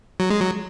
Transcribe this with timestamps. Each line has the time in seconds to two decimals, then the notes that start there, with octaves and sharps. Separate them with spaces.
0.20 F#3
0.30 G#3
0.41 F#3